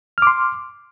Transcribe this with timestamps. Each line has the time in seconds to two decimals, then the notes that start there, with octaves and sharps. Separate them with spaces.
0.18 F6
0.22 D6
0.27 C6